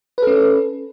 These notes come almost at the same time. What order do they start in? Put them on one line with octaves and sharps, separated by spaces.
B4 A4 C#4